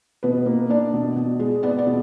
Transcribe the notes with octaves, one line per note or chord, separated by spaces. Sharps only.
B2 B4
A#3
D4 D5
B2
B2
G#3
B3 D5
D5
B2